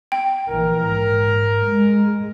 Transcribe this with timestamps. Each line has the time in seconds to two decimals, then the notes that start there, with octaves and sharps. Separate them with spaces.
0.12 G5
0.48 A#1 E3 A#4
0.88 G#2
1.67 G#3